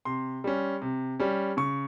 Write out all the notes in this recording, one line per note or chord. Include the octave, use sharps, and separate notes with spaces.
C3 C6
G3 C#4
C3
G3 C#4
C#3 C#6